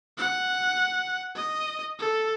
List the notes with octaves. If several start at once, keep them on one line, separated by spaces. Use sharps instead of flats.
F#5
D#5
A4